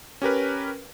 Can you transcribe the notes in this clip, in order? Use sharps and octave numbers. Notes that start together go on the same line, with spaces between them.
C#4 G4 A#4 B4